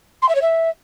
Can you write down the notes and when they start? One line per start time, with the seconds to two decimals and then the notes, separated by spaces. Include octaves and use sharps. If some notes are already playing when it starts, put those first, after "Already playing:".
0.22 C6
0.29 E5
0.35 C#5
0.42 E5